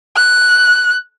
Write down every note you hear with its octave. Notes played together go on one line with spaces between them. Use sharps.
F#6